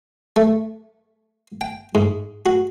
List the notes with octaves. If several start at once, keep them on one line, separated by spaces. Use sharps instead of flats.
A3
G5
G#2
F#4